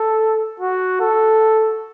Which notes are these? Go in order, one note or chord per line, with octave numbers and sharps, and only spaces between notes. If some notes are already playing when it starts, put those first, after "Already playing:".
Already playing: A4
F#4
A4